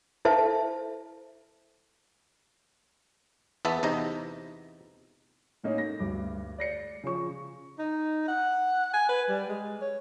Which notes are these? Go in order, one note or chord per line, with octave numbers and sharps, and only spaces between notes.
E4 A4 C5 E5 A5
E2 B3 E5 A5
E2 C3 D#4 A#5
A2 A3 A#3 C#4 D#4
A#6
D2 G2 D6
D5 A#6 C#7
C#3 F3 C#6
D#4
F#5
G#5
B4
G3
G#3
C#5